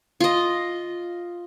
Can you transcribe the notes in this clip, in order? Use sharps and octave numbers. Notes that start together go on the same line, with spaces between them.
F4 D#5